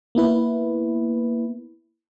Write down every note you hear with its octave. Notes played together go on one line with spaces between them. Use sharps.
A#3 B3 E4 B4